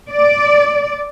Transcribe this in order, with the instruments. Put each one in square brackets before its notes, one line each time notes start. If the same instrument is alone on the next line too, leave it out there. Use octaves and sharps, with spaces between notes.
[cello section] D5